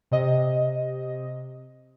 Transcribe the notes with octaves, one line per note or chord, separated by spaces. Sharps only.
C3 D#5